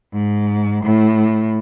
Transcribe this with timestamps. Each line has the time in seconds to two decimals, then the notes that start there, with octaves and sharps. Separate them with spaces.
0.14 G#2
0.84 A2